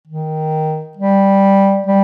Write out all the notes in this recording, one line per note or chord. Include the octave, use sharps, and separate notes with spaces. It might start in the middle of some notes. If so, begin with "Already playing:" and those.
D#3
G3
G3